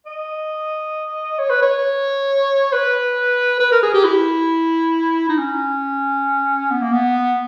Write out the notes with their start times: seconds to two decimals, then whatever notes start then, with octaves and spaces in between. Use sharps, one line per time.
0.06 D#5
1.39 C#5
1.50 B4
1.62 C#5
2.72 B4
3.60 B4
3.72 A#4
3.82 G#4
3.94 G4
4.04 E4
5.29 D#4
5.38 C#4
6.71 B3
6.81 A#3
6.92 B3